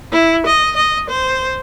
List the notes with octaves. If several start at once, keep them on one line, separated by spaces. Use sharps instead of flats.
E4
D#5
D#5
C5